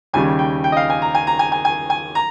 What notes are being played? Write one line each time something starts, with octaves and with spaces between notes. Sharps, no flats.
D#2 C#3 G3 G#5
G5
G5
D#5
F5
G#5
A#5
G#5
A#5
G#5
G#5
G#5
G#5
A#5